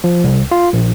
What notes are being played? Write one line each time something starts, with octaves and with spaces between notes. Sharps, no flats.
F3
C2
F4
A#1